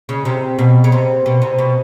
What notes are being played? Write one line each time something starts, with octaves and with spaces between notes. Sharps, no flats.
C#3
C3
B2
C#3
C3
B2
C3
B2